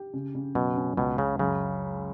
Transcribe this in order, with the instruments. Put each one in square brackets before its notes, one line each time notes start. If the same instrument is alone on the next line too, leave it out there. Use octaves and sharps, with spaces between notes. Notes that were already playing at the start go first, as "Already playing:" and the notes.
Already playing: [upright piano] G4
C#3
C#3
[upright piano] F#2 [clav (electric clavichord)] B2
[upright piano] C#4
[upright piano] C#2 [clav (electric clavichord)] B2
[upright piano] C#2 [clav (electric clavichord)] C#3
[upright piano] F#2 [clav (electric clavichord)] C#3